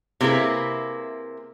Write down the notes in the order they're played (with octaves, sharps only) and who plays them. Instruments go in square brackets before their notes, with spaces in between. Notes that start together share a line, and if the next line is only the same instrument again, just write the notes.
[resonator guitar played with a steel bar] C3 A#3 E4 G#4 B4